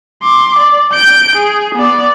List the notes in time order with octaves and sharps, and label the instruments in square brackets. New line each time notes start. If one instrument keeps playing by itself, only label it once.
[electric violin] C6 D6
D5
G6 D7
G#4
B3 D5